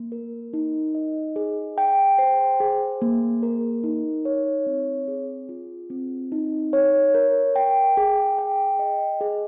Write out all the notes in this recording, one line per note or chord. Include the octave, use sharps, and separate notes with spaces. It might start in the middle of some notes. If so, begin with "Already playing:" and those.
Already playing: A#3
A#4
D#4
D#5
G#4
G5
C5
G#4
A#3
A#4
D#4
C#5
C4
G#4
F4
C4
D#4
C#5
A#4
G5
G#4
G5
D#5
G#4